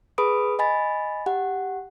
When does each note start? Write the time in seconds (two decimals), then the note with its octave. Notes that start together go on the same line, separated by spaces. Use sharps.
0.18 G#4 B4 B5 D#6 D7
0.59 D#5 G#5 B5 A6
1.26 G4 F#5